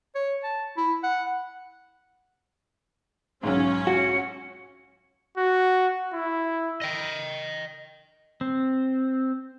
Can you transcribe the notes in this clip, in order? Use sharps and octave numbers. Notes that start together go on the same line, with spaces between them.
C#5
A5
E4
F#5
B1 G#2 C#4
F#4 C#7
F#4
E4
D#5 G5
C4